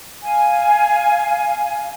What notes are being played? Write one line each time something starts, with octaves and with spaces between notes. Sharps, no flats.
F5 G#5